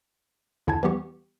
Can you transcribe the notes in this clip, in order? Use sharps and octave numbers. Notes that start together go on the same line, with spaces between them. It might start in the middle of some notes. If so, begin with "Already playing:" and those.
E2 D3 E4 G#5 A5 G#6
E3 G3 B3 G4 C#6